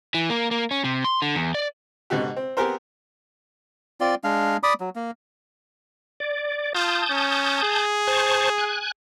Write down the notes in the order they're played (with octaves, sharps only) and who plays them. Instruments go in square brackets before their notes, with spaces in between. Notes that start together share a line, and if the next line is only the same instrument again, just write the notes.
[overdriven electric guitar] E3
A#3
A#3
C#4
C3
C6
D3
E2
D5
[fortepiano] G#2 B2 D3 F#4 G4
C4
B3 C4 G4 G#4 A#4 C5
[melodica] C4 F4 D5
G#3 D4 F5
D5 B5 D6 D#6
F#3
A#3
[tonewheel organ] D5
[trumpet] F4 [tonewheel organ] A5 D#6 G6
[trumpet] C#4
G#4
[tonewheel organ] C5 A5 C#6
G#5 F#6